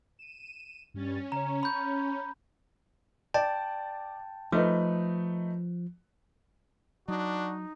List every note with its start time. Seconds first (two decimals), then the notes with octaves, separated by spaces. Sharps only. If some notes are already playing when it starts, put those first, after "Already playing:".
0.19 D#7 E7
0.94 G2 G3 C#4 A6
1.32 C#3 C#5 A#5
1.63 C#5 B5 G6
3.34 D5 G5 A5
4.52 F3 A3 D#4 B4
7.08 F#3 D4 D#4 F#4